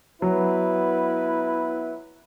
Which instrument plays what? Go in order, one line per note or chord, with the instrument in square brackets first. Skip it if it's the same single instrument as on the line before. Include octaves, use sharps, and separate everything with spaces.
[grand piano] F#3 [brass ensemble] B3 E4 B4